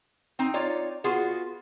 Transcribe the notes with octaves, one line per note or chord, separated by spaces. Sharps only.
C4 D#4
D#4 F4 C#5 D5
B3 F4 F#4 G#4